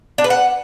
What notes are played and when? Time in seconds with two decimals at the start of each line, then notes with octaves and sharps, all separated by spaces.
0.18 D4
0.24 B4
0.30 F#5